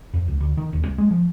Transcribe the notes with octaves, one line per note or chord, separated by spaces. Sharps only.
F2
C#2
D2
D#3
D#1
C2
G#3
F3